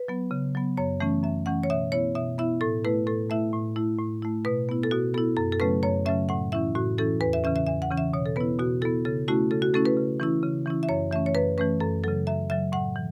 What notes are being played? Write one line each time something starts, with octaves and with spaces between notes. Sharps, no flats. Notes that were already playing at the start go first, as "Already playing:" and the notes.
Already playing: B4
F#3 B3
C#3
F#3 B3
F#2 C#5
E3 A3 C#4
F#2 E5
E3 A3 C#4 F#5
C#5
B2 E5
B3 E4 C#5
B2 E5
B3 E4 E5
A2 A4
A3 E4 B4
A2 A4
A3 E4 E5
A2
A3 E4
A2
A3 E4
B2 B4
B3 E4
A4
B2 F#4
B3 E4 A4
F#2 A4
A4
C#3 F#3 A3 C#4 B4
F#2 C#5
C#3 F#3 A3 C#4 E5
A2 F#5
E3 C#4 E4 E5
A2 F#4
E3 C#4 E4 A4
E2 B4
E5
C#3 E3 C#4 E5
E5
E2 E5
F#5
C#3 E3 C#4
E5
B2 C#5
A4
B3 E4 B4
B2 F#4
B3 E4 A4
C#3 A4
A3 C#4 E4 F#4
C#3 A4
F#4
A3 C#4 E4 A4
B4
C#3
E3 C#4 E4
C#3
E3 C#4 E4
E5
F#2 C#5
E3 A3 C#4 E5
C#5
F#2 B4
E3 A3 C#4 B4
F#2 A4
C#3 F#3 A4
F#2 E5
C#3 F#3 E5
A2 F#5
E3